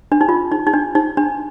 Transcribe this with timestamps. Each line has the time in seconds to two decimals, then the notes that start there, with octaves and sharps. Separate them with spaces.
0.12 D4
0.21 D#4
0.29 F4
0.52 D#4
0.67 D#4
0.73 D4
0.95 D#4
1.17 D4